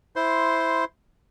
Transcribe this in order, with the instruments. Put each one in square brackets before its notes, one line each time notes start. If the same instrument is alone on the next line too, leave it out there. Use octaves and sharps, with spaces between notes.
[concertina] E4 C5 C6